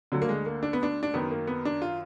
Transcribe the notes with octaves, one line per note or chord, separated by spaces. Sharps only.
D2 D3 F#3
A#3
G#3
A#3
D4
B3
D4
D4
F#2 D#3 B3
A#3
B3
D4
F4